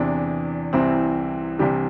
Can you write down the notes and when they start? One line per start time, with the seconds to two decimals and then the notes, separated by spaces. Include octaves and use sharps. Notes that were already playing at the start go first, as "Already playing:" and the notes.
Already playing: E2 C3 E3 D4
0.73 C2 C3 E3 C4 E4
1.59 C2 C3 E3 D4 G4